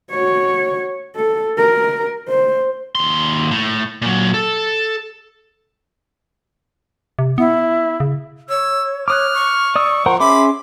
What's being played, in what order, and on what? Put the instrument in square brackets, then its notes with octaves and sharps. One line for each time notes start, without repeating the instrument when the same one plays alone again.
[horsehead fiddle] F#4 C#5
A4
A#4
C5
[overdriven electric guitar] D#2 C6
A2
A#2 F#3
A4
[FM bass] C3
[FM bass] B3 [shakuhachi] E4
[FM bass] C#3
[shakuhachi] C#5 [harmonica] E6
[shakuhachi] C#5 [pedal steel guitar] D6 D#6 F#6 [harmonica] F6
[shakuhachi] C#6
[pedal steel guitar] D5 D#6 E6
[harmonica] F3 [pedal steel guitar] A#4 C5 F#5
[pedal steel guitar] C#4 G#4 C6 [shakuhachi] E5 [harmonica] B5 D6